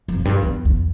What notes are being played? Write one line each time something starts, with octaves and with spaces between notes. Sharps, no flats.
F2
F2
G2
E2
E2